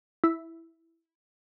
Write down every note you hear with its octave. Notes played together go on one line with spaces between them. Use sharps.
E4